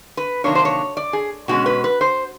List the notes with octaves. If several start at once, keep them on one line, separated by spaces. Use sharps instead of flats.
B4
C3 D#3 F#3 A#3 D4 C#5
C5
C#5
D5
G#4
B2 G#3 C#4 F#4
B4
B4
C5